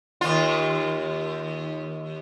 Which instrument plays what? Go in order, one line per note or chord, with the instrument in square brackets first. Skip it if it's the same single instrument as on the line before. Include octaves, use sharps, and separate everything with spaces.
[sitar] D#2 F4